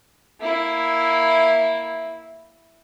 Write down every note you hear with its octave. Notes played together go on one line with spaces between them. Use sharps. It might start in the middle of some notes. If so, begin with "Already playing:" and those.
A#3 E4